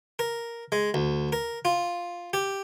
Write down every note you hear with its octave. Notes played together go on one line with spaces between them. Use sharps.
A#4
G#3
D2
A#4
F4
G4